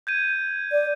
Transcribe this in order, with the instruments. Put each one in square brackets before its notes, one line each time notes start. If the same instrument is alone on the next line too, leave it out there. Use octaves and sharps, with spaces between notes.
[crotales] G6 G#6 D#7
[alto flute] D5